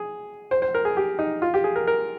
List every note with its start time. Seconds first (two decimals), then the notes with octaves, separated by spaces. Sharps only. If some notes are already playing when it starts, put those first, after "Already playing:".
Already playing: G#4
0.51 C5
0.62 C5
0.75 A#4
0.85 G#4
0.97 G4
1.19 D#4
1.42 F4
1.54 G4
1.64 G#4
1.76 A#4
1.87 A#4